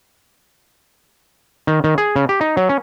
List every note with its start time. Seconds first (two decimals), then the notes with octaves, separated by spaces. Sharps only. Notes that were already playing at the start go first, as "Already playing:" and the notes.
1.67 D#3
1.84 D#3
1.98 G#4
2.16 C#3
2.29 G4
2.41 D#4
2.57 F#3
2.69 C#4